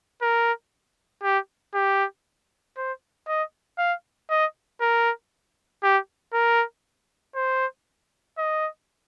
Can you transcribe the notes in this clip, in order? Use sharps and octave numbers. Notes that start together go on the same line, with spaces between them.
A#4
G4
G4
C5
D#5
F5
D#5
A#4
G4
A#4
C5
D#5